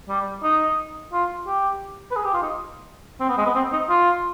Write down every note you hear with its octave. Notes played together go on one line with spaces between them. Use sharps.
G3
D#4
F4
G4
B4
G#4
G4
F4
D#4
C4
B3
G#3
B3
C4
D#4
F4